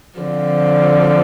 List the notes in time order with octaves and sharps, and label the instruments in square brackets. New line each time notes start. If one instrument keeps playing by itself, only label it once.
[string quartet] D3 F3 C4